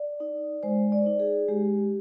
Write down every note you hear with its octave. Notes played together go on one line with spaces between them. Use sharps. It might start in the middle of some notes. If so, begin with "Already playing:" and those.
Already playing: D5
D#4
G#3 C5
D5
D#4
G#4
G#3 G4